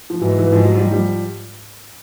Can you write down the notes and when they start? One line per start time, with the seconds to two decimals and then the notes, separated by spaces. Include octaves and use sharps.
0.10 F3
0.21 G#2 E3 F#3
0.39 E3
0.50 G#2 F3
0.65 F#3
0.77 F3 G3
0.91 F3 G3